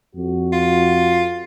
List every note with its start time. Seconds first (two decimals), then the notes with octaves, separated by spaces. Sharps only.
0.16 F2 F#4
0.53 F4